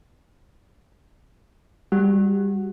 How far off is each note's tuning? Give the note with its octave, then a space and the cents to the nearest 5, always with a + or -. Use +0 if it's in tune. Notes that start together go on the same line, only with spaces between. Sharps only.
G3 +20 F#4 +0